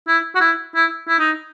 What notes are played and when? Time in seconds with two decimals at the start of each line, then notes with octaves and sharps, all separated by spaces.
0.07 E4
0.35 F#4
0.41 E4
0.75 E4
1.08 E4
1.19 D#4